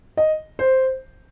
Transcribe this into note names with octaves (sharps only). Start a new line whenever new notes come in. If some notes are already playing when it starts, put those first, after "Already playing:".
D#5
C5